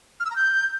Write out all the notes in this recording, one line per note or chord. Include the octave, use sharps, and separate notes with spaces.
F6
E6
A#5
G6